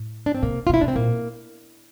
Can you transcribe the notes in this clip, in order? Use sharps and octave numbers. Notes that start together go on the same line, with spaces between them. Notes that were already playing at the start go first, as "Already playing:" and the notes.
Already playing: A2
D4
C4
C3 A#3
F4
C3
E4
C3 D4
C4
A#2 A#3